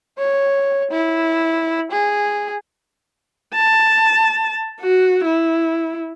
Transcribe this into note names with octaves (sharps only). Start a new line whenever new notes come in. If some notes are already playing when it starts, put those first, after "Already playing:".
C#5
E4
G#4
A5
F#4
E4